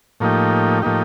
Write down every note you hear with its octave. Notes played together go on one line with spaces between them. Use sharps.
A2 F3 A#3 D#4 G4
A2 F3 A#3 D#4 G4